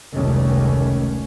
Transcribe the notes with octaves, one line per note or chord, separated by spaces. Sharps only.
F1 C#2 D#3 G3 A3 C#4